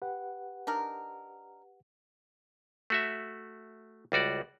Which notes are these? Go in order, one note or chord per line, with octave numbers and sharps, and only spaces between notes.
G4 B4 F#5
D4 D#4 A#4
A3 F#4 E5
C#2 G3 F#4 D5